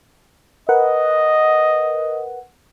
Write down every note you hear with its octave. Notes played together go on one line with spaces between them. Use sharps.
A#4 B4 D#5 F#5